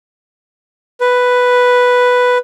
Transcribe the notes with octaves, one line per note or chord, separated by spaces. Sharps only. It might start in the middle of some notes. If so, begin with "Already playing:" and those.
B4